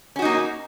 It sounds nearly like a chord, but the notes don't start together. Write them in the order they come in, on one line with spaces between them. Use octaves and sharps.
C#4 F#4 D#4 A#3